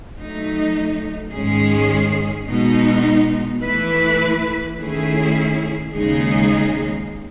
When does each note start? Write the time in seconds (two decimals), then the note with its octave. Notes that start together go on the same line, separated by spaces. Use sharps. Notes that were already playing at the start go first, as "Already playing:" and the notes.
0.17 F#3 A3 D#4
1.33 G#2 D#3 G#3 C#4 G#4
2.47 B2 G#3 D#4
3.62 E3 A3 E4 B4
4.77 D#3 A3 C#4 E4 G#4
5.93 D#2 C#3 G#3 D#4 G#4